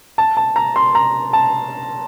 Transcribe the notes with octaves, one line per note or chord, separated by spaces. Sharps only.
A5
A5
A#5
C6
A#5
A5